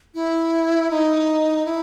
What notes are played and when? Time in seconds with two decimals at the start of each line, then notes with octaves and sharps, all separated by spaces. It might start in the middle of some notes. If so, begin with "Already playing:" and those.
0.14 E4
0.90 D#4
1.65 E4